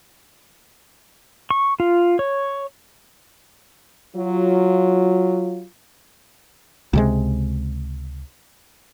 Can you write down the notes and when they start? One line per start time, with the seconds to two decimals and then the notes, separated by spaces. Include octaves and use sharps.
1.51 C#6
1.80 F4
2.19 C#5
4.15 F#3 F4
6.93 C#2 C3 G#3